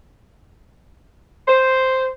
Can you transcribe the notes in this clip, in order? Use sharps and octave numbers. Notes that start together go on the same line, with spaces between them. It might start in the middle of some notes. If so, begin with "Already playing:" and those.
C5